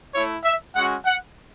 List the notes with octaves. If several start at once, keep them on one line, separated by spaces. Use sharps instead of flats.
A3 E4 C#5
E5
G#3 C#4 F#4 F#5
F#5